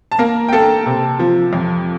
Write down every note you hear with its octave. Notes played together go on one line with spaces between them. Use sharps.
A5
A#3 A#4 A#5
G5
A#3 A4 A5
C3
F3
F2